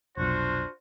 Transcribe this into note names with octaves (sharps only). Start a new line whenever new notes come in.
F1 B1 D4 F4 F#4 C5